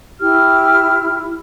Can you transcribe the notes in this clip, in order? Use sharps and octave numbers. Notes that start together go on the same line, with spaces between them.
E4 G4 F6